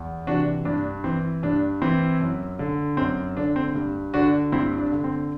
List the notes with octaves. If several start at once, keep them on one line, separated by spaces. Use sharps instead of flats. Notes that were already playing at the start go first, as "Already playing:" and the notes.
Already playing: E2
C3 E3 D4 F#4
G2 D4
E3 C4
G2 D4
E3 C4 E4
F#2
D3
F#2 C4
D3 D4
C4
G2
D3 D4 F#4
G2 C4 E4
D4
D3
C4